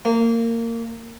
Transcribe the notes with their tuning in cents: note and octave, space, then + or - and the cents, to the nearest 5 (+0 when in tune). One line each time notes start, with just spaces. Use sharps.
A#3 -20